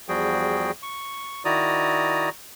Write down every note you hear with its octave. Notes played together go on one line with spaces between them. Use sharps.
E2 F3 G3 F#4 G#4 G5
C#6
D#3 E4 F#4 D5 A#5 D#6